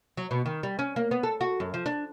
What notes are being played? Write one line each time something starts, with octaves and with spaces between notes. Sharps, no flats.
F#3
B2
D#3
G3
C#4
A#3
B3
A4
F#4
F#2
F3
D4